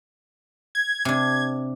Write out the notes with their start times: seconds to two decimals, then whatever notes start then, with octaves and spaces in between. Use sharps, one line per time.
0.75 G#6
1.05 C3 D4